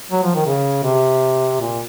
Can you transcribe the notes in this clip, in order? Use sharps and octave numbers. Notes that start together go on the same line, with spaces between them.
F#3
F3
D#3
C#3
C3
A#2